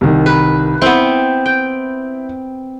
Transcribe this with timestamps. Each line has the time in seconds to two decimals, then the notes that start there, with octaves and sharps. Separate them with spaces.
0.01 C2 D#3
0.26 B4
0.81 B3 C4 E4
1.46 G5